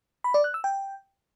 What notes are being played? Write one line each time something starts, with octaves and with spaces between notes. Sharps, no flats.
B5
D5
F#6
E6
G5